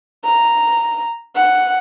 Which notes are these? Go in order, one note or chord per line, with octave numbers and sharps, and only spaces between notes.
A#5
F#5